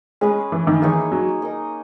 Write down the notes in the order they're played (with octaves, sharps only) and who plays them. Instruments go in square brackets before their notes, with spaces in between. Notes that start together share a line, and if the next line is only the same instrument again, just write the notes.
[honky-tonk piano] G#3 [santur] C#4 G#4 B4
[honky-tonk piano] E3
D#3
[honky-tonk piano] E3 [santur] A#3 D#4 G#4 C#5
[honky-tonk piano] F#3
[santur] D#4 A#4 D#5